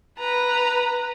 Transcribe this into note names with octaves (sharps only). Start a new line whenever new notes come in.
B4 A#5